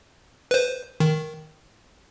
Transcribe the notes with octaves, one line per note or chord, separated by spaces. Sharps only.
B4 C5
D#3